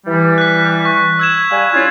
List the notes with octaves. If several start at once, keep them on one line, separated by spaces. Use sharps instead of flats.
E3 G3
F#6 B6
C#6
E6 G#6 E7
G3 F5 G#5
C#4 E4 F4 D#6